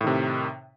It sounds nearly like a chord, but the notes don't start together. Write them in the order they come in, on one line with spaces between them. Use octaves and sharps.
A2 D#3 C3